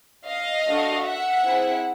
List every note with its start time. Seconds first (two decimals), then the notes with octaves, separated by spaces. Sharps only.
0.27 D#5 F5
0.67 A3 D4 F#4 A4
1.05 E5 F#5
1.44 C4 E4 G#4